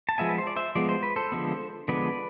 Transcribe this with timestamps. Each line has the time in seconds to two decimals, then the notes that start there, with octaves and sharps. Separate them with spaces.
0.09 A5
0.18 F3 G#3 B3 E5 G#5
0.29 B4
0.38 C5
0.47 D5
0.56 C5 E5
0.75 F3 G#3 B3 D5
0.89 C5
1.03 B4
1.16 A4 C5
1.32 D3 F3 G#3 B3
1.88 D3 F3 G#3 B3 B4 D5